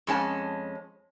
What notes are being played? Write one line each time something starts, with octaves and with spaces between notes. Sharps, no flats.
F2 G#3 C#4 A5